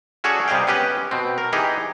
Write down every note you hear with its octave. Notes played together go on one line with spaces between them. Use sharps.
C#4 F#4 G#4 A4 C#5 D5
C3 G3 G#4 D#5 F5 G5
B3 C#4 G4 B4 D#5
B2 C4
A#4
E3 D#4 G4 G#4 D#5